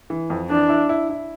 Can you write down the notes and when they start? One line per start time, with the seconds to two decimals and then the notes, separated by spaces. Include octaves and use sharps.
0.10 E3
0.30 F2
0.50 E3 D4
0.69 E4
0.89 E4
1.10 E4